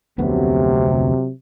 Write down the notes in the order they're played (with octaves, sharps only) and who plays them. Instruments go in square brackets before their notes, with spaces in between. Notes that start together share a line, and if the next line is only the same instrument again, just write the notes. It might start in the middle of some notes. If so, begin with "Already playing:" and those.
[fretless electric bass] F1 D2 B3 [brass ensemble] C3 F#3